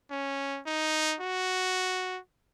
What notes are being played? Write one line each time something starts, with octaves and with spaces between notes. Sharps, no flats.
C#4
D#4
F#4